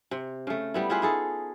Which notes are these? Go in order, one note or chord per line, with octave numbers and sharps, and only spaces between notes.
C3
C#3 A3
G3 B3 E4
E4 F4 G#4 B4
D#4 G#4 A4